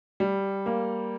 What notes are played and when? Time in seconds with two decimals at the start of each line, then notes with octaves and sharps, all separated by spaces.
0.20 G3
0.66 A#3